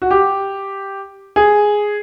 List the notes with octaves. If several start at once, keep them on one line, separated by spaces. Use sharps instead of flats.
F#4
G4
G#4